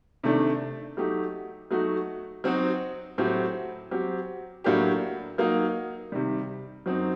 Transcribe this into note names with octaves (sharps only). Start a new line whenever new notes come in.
C3 D#3 A3 D4
F#3 A3 D#4 G4
F#3 A3 D#4 F#4
F#3 C4 D#4 F#4
A2 F#3 C4 G4
F#3 C4 G4
A2 F#3 A#3 D4 G4
F#3 A#3 D#4
C3 D#3 G3
F#2 F#3 C4 D#4